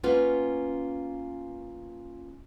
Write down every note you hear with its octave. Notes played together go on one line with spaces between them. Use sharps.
A#3 B3 C#4 F4 B4